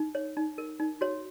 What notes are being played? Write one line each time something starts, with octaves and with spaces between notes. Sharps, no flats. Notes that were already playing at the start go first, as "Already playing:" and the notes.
Already playing: D#4
C#5
D#4
A#4
D#4
F#4 C#5